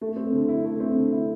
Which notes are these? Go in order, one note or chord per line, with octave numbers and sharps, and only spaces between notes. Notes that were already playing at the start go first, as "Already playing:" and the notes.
A3
C4
D3
E4
A3
C4
D3
E4